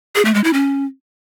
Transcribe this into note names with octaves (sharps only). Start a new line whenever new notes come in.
G#4
A3
G#3
E4
C#4